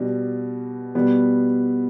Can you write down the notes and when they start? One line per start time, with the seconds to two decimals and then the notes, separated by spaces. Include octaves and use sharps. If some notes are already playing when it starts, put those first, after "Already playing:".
Already playing: B2 G3 D4
0.95 B2 G3 B3